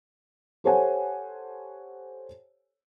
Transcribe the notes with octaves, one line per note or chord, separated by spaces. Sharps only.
G4 A4 C5 C#5 F#5 G#5